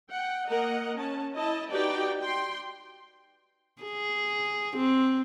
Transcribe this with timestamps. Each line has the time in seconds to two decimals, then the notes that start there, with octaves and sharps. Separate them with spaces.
0.12 F#5 G5
0.47 A#3 A#4 D#5 F#5
0.97 C#4 A5
1.36 E4 D#5 A5
1.71 D#4 F#4 G4 B4 D5 G5
2.19 G5 C6
3.82 G#4
4.76 C4